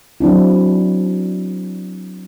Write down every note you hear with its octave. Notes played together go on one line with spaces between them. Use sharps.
F#3 C4 D4 E4